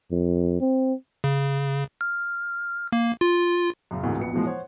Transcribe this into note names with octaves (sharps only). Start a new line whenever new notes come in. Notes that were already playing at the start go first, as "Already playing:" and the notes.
F2
C4
C#3
F6
A#3
F4
F#2 C#3
D2 G#2 C3 E3 G#3 A#3
A#1 F2 B3 C#7
B2 E3 F3 G#3
C5 C#5 F#5